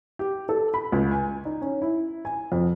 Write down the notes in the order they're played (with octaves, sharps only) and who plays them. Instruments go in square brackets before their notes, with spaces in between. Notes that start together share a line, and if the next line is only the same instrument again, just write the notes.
[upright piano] G4
A4
B5
C#2
G#5
D#4
C#4
E4
G#5
F2